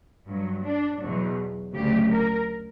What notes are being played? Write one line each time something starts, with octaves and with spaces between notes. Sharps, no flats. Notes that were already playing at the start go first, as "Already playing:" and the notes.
G2 F#3
D4
E2 B2 F#3
D2 C#3 F#3 G4
A#4